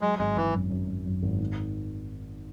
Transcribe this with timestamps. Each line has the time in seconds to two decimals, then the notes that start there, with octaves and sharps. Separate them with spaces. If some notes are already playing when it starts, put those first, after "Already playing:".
0.01 F#3 G#3
0.19 G#1 G#3
0.36 G#1 E3
0.54 F#2
0.70 F#2
0.88 F#2
1.06 F#2
1.23 G#1
1.40 D#3